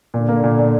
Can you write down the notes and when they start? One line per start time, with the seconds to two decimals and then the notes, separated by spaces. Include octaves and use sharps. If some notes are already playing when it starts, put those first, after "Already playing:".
0.14 A#2 D3
0.29 A#3
0.43 A#2
0.59 A#2